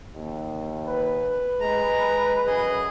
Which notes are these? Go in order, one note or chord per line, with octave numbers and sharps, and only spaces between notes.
D#2
B4
G#3 A#5
F#2 G#4 D#5